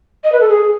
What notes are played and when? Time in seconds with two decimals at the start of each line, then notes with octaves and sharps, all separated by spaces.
0.24 D#5
0.32 B4
0.40 A4
0.48 G#4